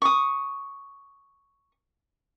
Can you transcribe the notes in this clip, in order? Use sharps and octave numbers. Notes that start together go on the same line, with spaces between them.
C#6 D#6